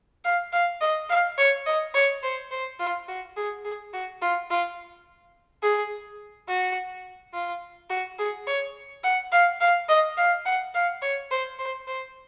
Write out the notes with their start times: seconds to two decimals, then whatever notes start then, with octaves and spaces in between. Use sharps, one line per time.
0.25 F5
0.52 F5
0.81 D#5
1.10 F5
1.38 C#5
1.66 D#5
1.94 C#5
2.23 C5
2.51 C5
2.79 F4
3.08 F#4
3.37 G#4
3.65 G#4
3.93 F#4
4.22 F4
4.50 F4
5.63 G#4
6.49 F#4
7.34 F4
7.90 F#4
8.19 G#4
8.47 C#5
9.04 F#5
9.32 F5
9.61 F5
9.89 D#5
10.17 F5
10.46 F#5
10.74 F5
11.02 C#5
11.31 C5
11.59 C5
11.87 C5